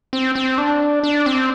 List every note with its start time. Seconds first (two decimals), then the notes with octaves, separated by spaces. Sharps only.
0.13 C4
0.35 C4
0.58 D4
1.03 D4
1.26 C4